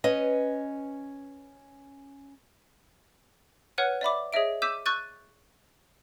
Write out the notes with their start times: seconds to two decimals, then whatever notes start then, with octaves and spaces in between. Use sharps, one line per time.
0.04 C#4 B4 D#5
3.78 B4 C#5 F#5 F6 F#6 D#7
4.01 D5 E5 B5 D6
4.33 G#4 C#5 D#5 E5 D7
4.62 D6 E6 G6 B6 D#7 E7
4.86 C#6 E6 F#6 G6 A6 D#7